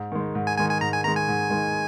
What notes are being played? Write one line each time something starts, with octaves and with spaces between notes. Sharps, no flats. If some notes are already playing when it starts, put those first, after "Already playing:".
Already playing: G#2
D#3 G#3
G#2
G#5
D#3 G#3 G#5
G#5
G#2 A#5
G#5
D#3 G#3 A#5
G#5
G#2
D#3 G#3